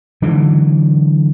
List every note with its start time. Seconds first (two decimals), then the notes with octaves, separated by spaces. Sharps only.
0.22 D3 E3 F#3 G#3